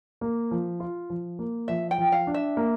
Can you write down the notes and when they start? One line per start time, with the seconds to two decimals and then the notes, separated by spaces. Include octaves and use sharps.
0.21 A#3
0.51 F3
0.80 F4
1.10 F3
1.39 A#3
1.68 F3 E5
1.91 G5
1.98 F3
2.12 F5
2.27 D4
2.34 E5
2.57 A#3